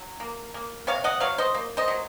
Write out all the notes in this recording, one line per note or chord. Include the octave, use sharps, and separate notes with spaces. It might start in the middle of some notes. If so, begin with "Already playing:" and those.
Already playing: F#3
A#3
A#3
C3 C#5 F5
D#5 F#5
F#3 C#5 F5
C5 D#5
A#3
C5 D#5
F#3